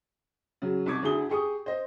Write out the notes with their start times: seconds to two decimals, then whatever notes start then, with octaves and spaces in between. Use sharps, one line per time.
0.62 C#3 F#3
0.86 C2 D#4 C#6 D6 G#6
1.03 D2 D3 E4 G#4 D#6 G7
1.29 G4 G#4 C#6 D#6
1.66 C5 D#5